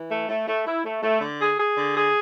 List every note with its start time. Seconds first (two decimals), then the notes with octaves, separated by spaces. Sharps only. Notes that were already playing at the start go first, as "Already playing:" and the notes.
Already playing: E3
0.10 A3
0.28 A3
0.47 A3
0.66 E4
0.84 A3
1.02 A3
1.21 D3
1.40 G#4
1.58 G#4
1.76 D3
1.95 G#4